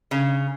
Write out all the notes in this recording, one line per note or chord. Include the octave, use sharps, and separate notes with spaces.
C#3